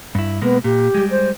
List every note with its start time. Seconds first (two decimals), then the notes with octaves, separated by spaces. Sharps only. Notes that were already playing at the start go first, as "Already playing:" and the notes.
0.15 G2 E4
0.41 B2 G#3 A#3 B3
0.64 A#2 G4
0.94 G3 G#3
1.11 C5